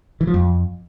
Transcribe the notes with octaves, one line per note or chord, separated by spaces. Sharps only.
E3
F3
F2